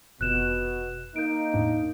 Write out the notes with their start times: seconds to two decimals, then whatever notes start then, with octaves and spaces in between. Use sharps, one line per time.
0.21 F1 B2 F#6 E7
1.16 A#3 D#4 G6 D7
1.54 E2 A2 D4